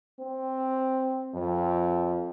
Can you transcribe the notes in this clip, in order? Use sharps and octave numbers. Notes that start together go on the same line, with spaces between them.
C4
F2